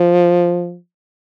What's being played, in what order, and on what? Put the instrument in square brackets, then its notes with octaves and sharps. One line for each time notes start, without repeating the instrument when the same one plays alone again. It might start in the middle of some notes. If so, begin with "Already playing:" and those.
Already playing: [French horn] F3